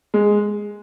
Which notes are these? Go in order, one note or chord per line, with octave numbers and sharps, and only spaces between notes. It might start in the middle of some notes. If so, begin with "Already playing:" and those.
G#3